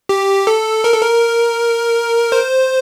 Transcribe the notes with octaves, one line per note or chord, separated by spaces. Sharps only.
G4
A4
A#4
A4
A#4
C5